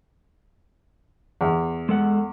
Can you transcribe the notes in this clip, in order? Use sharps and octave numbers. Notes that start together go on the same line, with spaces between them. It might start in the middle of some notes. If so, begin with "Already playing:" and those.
E2
G#3 A4 F#5